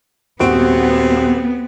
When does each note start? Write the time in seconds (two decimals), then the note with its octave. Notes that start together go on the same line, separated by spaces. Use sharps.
0.40 D#1 B3 C4 F#4 D7